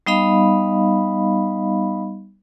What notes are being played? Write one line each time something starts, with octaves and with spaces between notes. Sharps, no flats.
G3 B3 D#4 D#5 F5 B5